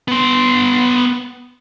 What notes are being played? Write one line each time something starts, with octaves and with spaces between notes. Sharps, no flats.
B3 C6